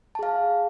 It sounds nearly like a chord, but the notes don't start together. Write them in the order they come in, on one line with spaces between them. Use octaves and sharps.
A5 G#4 F5